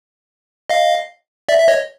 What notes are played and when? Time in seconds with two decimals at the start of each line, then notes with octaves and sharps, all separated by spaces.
0.70 D#5 F5
1.49 D5 E5
1.60 E5
1.68 C#5 D#5